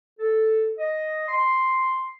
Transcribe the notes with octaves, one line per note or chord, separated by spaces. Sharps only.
A4
D#5
C6